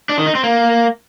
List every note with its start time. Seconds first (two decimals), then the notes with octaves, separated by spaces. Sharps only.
0.09 D4
0.18 D#3
0.26 D#4
0.35 C4
0.44 A#3